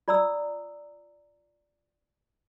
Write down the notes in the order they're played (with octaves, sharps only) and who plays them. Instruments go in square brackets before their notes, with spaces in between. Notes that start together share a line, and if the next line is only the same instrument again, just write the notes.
[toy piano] F4 D5 A#5 D#6 E6